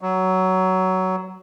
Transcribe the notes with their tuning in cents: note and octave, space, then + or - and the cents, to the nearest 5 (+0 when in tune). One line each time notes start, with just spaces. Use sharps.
F#3 +15